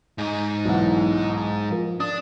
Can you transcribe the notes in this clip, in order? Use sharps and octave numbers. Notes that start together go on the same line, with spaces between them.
G#2 D#4
B1 E3 F#5
F3 A#4
D4 D#6